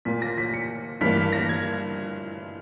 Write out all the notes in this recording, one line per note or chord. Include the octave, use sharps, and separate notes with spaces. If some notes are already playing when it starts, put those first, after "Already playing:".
A#2 A#3 B6
A#6
B6
C#7
G2 E3 A#3 B6
B6
A#6
G#6